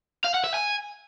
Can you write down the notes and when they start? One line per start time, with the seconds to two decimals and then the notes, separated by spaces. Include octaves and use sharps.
0.25 F5
0.34 F#5
0.44 E5
0.54 G#5